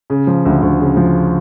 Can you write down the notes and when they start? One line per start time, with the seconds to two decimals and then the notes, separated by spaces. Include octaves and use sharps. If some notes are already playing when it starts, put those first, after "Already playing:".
0.10 C#3
0.27 F3
0.45 D2
0.62 D2
0.80 C#3
0.97 F3